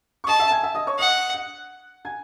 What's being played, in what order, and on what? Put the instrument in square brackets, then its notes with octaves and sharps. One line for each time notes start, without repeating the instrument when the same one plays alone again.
[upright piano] C#6
[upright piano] D#5 D#6 [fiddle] A5
[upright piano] E5 E6
G#5 G#6
E5 E6
D#5 D#6
C#5 C#6
[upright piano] D#5 D#6 [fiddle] F#5
[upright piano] F#5 F#6
G#5 G#6